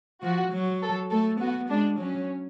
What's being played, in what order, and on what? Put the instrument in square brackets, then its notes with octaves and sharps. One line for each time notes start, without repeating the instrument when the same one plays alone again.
[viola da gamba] F3 [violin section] F#4
[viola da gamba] F#3
[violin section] A4
[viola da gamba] A3 [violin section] A4
[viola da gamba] B3 [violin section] F#4
[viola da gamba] G#3 [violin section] D4
[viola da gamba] F#3 [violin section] C#4